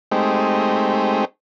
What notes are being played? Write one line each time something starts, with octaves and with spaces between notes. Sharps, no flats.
G#3 A3 C4 D#4 G4